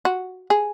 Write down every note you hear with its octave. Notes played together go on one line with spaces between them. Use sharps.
F#4
G#4